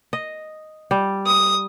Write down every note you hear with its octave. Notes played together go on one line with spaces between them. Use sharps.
D#5
G3
D#6